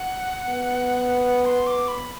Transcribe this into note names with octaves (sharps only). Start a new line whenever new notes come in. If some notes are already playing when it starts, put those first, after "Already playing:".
Already playing: F#5
B3
C6
D6
B5